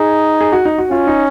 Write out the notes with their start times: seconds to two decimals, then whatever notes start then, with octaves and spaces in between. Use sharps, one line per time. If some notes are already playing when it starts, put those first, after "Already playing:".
Already playing: D#4 G#4
0.41 G#4
0.52 F#4
0.65 D#4
0.78 F#4
0.90 C#4 F4
1.07 D#4